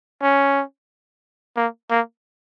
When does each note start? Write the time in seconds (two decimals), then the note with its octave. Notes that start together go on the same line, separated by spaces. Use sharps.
0.22 C#4
1.56 A#3
1.90 A#3